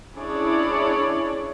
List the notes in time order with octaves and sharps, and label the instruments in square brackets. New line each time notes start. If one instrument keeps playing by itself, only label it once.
[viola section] C#4 D4 E4 G#4 C#5 D5